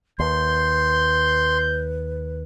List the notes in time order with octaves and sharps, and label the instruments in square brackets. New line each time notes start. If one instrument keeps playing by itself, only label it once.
[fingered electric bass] D#2 [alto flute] B4 [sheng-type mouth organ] C6 [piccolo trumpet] G6